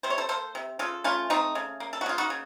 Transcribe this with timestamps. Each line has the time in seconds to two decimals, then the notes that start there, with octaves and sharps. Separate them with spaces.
0.03 C3 C5
0.10 C#5
0.18 A4 C5
0.29 A#3 A4 C5
0.55 C3
0.79 C#3 F4 A4
1.04 A3 C#4 F4
1.30 A3 C4 D#4
1.55 C#3
1.80 A#3
1.93 A4
2.01 F#4
2.06 C#3 F4
2.18 D#4 F#4
2.30 C#3